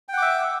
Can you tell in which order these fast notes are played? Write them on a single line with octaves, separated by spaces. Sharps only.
G5 F#5 D6 E5